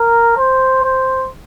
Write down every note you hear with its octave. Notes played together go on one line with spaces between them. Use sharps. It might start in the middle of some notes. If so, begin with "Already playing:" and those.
Already playing: A#4
C5
C5